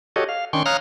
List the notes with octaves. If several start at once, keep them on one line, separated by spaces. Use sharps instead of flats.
F#4 G4 A4 C#5 D#5
F5
D#3 C#4 D4 G5 C6 C#6
C#5 F5 A#5 D#6 F6 F#6